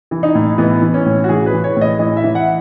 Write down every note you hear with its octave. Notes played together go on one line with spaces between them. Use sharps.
E3
D#4
A2
E3 B3
E3
C#4
A2
F#4
E3 G#4
B4
E3
C#5
A2
D#5
E3 D#5
E5
E3
F#5